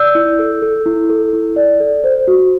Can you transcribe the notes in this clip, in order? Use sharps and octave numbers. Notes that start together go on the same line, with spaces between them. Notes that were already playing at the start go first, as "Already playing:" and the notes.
Already playing: D5 E6 G6
E4
A4
A4
E4
A4
E4
D5
A4
C5
F#4